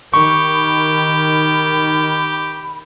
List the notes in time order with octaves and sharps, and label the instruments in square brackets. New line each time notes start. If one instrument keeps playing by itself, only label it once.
[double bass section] D#3 [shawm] G4 [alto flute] B5 [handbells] C#6